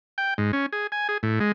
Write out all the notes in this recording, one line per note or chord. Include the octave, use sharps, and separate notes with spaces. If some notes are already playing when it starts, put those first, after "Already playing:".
G5
G#2
C#4
G#4
G#5
G#4
A2
G#3